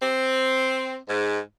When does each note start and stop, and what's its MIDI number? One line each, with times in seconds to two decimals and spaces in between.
0.01 0.96 60
1.08 1.39 44